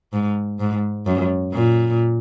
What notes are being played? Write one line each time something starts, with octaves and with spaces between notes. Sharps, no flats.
G#2
G#2
F#2
A#2